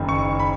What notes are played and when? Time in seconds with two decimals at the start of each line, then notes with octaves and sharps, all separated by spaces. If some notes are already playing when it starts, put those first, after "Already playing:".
Already playing: F#1 F#2 D#3
0.09 C#6
0.40 B5